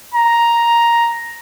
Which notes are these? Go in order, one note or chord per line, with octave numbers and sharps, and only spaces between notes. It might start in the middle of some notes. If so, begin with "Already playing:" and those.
A#5